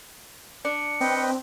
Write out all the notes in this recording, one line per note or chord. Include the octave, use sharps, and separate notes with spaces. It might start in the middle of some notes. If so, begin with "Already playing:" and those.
D4 C#7
C4 B4 D#5 G5